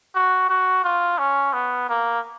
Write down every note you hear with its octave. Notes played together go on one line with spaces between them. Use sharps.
F#4
F#4
F4
C#4
B3
A#3